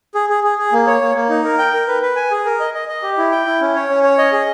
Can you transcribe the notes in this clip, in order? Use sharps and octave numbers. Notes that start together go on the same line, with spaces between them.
G#4
G#4
G#4
G#4
A#3
C#5
A#3
A#3
D#4
A#4
G5
A#4
B4
B4
G#5
G#4
A#4
D#5
D#5
D#5
G4
E4
G5
E4
C#4
C#5
C#4
C#5
D#5
G#4